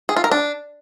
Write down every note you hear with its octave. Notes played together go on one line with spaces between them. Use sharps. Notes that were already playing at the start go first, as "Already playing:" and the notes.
G#4
F4
A#4
D4